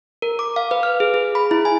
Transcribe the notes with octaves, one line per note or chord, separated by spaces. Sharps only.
A#4
D6
F5
B4
F6
G#4
G#4
B5
E4
G#5